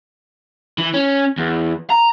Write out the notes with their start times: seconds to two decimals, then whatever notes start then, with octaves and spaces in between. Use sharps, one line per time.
0.78 E3
0.94 C#4
1.38 E2
1.90 A#5